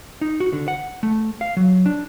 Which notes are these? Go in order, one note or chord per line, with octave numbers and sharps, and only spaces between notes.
D#4
F#4
D3
F#5
A3
F5
F#3
D4